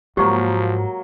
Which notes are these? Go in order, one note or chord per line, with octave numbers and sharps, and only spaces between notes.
G#2 F3 F#3 A#3 G4 C#6